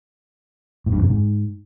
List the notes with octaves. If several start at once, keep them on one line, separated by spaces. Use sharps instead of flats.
A2
G2
F2
C3
G#2